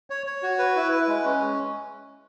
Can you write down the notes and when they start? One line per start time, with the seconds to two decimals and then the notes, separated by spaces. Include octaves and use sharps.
0.10 C#5
0.27 C#5
0.43 F#4
0.59 B4
0.76 E4
0.92 B4
1.08 G#3
1.25 C#4